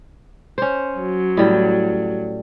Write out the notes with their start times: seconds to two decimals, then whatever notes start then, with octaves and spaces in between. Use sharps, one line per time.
0.58 C#4 C5
0.99 F#3
1.37 A2 G3